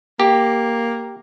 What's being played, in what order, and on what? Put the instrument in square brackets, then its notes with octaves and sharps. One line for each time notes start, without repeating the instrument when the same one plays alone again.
[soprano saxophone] A#3 [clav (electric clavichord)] G4